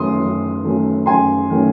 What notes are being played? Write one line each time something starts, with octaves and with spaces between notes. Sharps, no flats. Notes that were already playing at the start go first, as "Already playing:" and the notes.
Already playing: F#2 D#3 F#3 A3 C#4 C6 D#6
F#2
D#3 F#3 A3 C#4
F#2 G#5 C6
D#3 F#3 A3 C#4